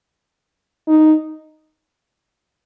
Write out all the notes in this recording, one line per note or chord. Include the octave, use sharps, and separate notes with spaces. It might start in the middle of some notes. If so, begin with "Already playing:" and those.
D#4